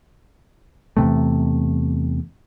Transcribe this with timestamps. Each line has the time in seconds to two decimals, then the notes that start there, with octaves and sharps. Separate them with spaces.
0.97 E2 C3 A3